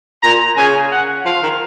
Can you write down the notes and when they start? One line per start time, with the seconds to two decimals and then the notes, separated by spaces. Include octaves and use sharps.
0.23 A#2 A#5
0.57 C#3 G#5
0.92 F#5
1.25 F3 F5
1.43 D#3